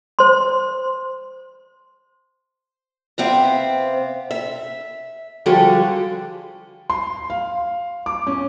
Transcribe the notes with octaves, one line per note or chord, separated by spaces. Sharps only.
C5 C6
C3 B3 C4 E5 F5
E5
D3 F3 G3 G#3 F#4 A4
C6
F5
D6
C#4